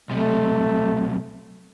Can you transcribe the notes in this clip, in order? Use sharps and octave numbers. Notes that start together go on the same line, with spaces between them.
B1 C3 A3